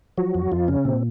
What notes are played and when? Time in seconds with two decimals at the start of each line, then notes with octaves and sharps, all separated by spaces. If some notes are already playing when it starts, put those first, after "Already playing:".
0.18 F3 F#3 F#4
0.35 F2
0.52 F2 F3 F4
0.68 C#3 C#4
0.85 A#2 C4